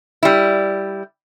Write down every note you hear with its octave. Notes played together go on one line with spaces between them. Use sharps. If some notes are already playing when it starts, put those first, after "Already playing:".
G3 E4